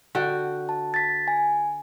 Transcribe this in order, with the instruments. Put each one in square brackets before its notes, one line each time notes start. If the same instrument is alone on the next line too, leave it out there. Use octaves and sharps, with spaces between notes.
[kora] D3 F#4 G5
[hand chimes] A5
A6 B6
G#5